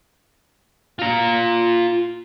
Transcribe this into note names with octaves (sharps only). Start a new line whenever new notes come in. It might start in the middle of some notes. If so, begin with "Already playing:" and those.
F4 A#5